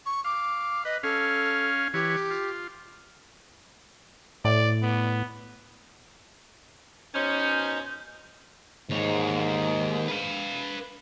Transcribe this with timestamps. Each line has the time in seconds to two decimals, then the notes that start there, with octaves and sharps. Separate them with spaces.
0.06 C#6
0.24 F5 D6
0.85 B4 D#5
1.03 C#4 A4 F5
1.94 E3 G4 C#5
2.31 F4
4.45 A2 D5
4.82 B3
7.14 B2 C#4 D#4 C5 G6
8.90 D#2 G#2 C#5
10.08 B4 F5